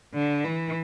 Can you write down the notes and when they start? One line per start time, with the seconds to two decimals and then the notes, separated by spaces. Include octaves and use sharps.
0.14 D3
0.44 E3